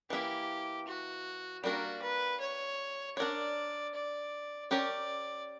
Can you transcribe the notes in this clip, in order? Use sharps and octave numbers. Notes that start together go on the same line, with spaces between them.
E3 A#3 E4 G4
F#4
G3 A#3 D4 F#4 A#4
B4
C#5
D4 A#4 C#5 D5
D5
C#4 G4 A#4 C#5 D5